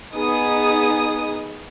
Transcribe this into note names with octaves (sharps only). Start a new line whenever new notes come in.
B3 D#4 G#4 D#6